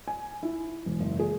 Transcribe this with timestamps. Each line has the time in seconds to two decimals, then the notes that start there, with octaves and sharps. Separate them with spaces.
0.08 G#5
0.43 E4
0.86 E1
1.00 F#1
1.19 G#4